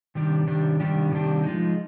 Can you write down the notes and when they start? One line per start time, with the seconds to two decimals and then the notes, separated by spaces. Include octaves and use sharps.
0.15 C3 D#3 G3 D4 G4
0.47 C3 D#3 G3 D4 G4
0.80 C3 D#3 G3 D4 G4
1.11 C3 D#3 G3 D4 G4
1.44 F3 G#3 D#4